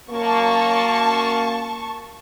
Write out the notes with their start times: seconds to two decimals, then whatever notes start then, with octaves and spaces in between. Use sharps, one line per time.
0.10 F#2 A#3 A5 C#6